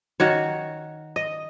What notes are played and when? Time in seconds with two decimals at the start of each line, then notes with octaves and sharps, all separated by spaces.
0.20 D#3 F#4 C#5
1.16 D#5